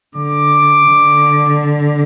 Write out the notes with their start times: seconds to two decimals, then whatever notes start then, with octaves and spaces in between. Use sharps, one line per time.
0.16 D3 D6
0.86 D3